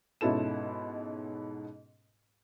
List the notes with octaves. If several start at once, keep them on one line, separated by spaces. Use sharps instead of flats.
G#2 B2 C#4 E4 A4 E7